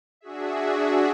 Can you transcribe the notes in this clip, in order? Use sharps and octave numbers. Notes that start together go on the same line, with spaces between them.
D4 F#4 G#4 E5